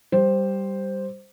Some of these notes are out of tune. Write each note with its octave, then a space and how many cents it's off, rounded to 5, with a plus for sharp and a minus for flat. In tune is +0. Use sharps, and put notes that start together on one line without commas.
G3 +0 C5 +0